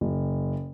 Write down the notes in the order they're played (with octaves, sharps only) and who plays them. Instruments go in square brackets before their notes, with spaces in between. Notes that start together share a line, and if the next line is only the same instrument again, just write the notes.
[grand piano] F#1